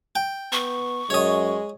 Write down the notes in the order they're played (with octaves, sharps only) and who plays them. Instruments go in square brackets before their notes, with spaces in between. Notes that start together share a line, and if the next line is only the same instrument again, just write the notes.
[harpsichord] G5
[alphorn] B3 [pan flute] C#6
[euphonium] F#2 [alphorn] G#3 [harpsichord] C#5 D#5